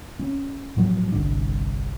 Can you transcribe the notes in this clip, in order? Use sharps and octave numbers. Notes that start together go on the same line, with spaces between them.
C#4
A2 F3 F#3 A3
G1 C2 D4